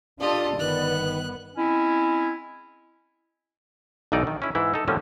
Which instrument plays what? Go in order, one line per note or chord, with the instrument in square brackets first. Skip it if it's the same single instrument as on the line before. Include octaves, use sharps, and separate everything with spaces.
[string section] D4 F4 A4 [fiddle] G4 D#5 [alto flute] D5
[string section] G1 B3 [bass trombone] D#3 [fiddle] F#6
[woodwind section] G#3 C4 C#4 E4
[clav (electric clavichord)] B1 B2 E3 D#4 D5
D#3
C#4 E4
G#2 E3 E4
D#4 A4
A2 D3 F3 G3 A#3 C#4